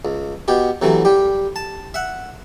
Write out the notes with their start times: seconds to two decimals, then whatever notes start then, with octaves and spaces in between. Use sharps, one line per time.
0.05 C#2
0.48 B2 B3 G4
0.82 A2 C3 E3 F#3
1.05 G3 G4
1.56 A5
1.94 E5 F#5